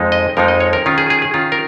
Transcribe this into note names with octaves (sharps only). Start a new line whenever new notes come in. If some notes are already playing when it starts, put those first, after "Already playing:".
Already playing: F2 F3 G#3 D#4
D#5
F2 F3 G#3 D#4 A#4
D#5
C#5
A#4
D#3 C#4 F4
G#4
G#4
G#4
D#3 C#4 F4
A#4